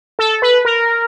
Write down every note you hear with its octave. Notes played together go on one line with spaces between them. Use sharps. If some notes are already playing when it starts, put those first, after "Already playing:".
A4
B4
A#4